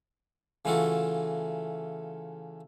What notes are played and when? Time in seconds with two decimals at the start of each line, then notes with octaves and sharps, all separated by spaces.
0.65 C#3 E3 A3 F4 F#4 A4